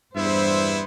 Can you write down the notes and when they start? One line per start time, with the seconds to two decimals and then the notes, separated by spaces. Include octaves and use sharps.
0.16 E2 G2 B3 E4 C5 E5